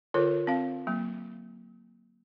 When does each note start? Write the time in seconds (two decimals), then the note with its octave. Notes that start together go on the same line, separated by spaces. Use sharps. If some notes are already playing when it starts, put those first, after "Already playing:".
0.14 D3 F4 A4 A#4 C#5
0.47 C4 F5
0.87 F#3 A#3